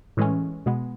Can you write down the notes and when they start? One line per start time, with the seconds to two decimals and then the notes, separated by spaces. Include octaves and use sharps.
0.17 A2 E3 G#3 C#4
0.66 B2 G#3 B3